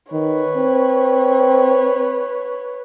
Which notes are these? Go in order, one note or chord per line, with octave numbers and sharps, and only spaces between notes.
D#3 B4 C#5
C4